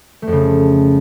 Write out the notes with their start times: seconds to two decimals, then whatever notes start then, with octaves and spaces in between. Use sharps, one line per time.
0.22 A3
0.27 F2
0.32 C#3